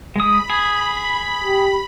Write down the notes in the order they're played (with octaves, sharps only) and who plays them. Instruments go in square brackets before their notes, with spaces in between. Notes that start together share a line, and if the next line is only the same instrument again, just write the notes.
[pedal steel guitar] G#3 D#6 [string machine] B5
[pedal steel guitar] G#4
[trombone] G4